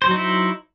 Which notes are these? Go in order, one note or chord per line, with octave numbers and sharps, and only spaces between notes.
F#3 D#4 E4 C5